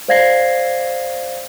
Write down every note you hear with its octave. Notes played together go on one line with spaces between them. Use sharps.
C5 D5 F5 G#6 A#6 C7